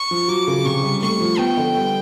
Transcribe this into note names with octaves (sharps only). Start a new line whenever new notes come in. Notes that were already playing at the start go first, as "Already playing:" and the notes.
Already playing: C#6
F3
F#3 D6
C#3
C3 C#6
G3
A3 C#6
F3
B3 G5
D3
G3